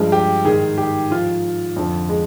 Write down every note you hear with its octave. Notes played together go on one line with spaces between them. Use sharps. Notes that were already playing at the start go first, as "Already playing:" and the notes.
Already playing: G2 F3 G#3
G4
G#2 D#3 G#4
G4
G#2 F3 F4
F2 D3 F3
G#3